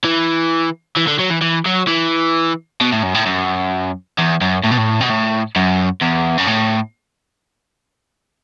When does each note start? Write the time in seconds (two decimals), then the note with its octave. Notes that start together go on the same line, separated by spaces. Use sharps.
0.05 E3
0.97 E3
1.08 D3
1.20 F#3
1.31 E3
1.42 E3
1.66 F#3
1.88 E3
2.81 B2
2.92 A2
3.03 F#2
3.14 A2
3.26 F#2
4.18 E2
4.41 F#2
4.64 A2
4.72 B2
4.78 A2
5.01 B2
5.10 A2
5.56 F#2
6.02 E2
6.38 F#2
6.47 A2